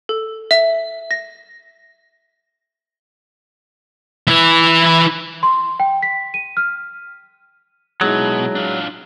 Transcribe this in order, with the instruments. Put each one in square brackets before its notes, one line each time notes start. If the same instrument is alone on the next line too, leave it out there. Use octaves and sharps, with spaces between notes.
[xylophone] A4
E5
A#6
[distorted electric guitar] E3 E4
[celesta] C6
G5
B6
D#7
F6
[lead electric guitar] B2 [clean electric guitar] F#3 [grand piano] G#3 D#4 E4
[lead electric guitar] D4 F4